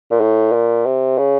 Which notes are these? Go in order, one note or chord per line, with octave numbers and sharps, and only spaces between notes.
A#2
A2
A#2
C3
C#3